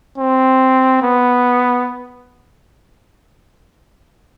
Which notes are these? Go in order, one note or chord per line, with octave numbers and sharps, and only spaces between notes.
C4
B3